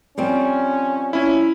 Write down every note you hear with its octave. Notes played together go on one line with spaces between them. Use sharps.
F3 G3 C4 C#4
C#4 E4